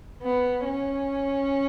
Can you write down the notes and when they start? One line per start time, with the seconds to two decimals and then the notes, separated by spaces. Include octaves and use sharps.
0.22 B3
0.65 C#4